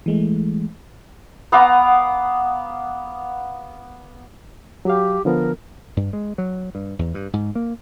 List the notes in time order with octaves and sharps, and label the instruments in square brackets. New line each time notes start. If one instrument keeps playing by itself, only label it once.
[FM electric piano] E3 G#3 A3
[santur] B3 F5 A#5 D6
[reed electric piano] F#3 F5 [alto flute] G4
[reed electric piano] D3 F3 B3 [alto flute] A#4
[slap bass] G2
G#3
F#3
G2
E2
G2
G#2
A#3